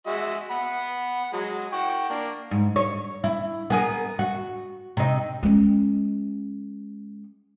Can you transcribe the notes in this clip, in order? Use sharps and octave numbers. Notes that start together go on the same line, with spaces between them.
G#3 F#4 E5
F#5 B5
F#3 G#3
F#5 G5 C#6
A#3 D4
G#2
C#5
E4
B3 G#4 A#4
F#4
C3 D#4
G#3 C#4